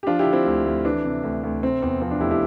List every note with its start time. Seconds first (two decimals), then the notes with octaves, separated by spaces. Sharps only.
0.03 G4
0.07 F3 D4 F4
0.19 E4 G4
0.26 D3
0.33 C4 E4
0.46 D2
0.65 D2
0.85 E3 D4
1.04 C3
1.23 D2
1.43 D2
1.62 C3 C4
1.82 E2 C4
2.01 F3 C4
2.11 D4
2.20 F1 E4 G4
2.31 E4 G4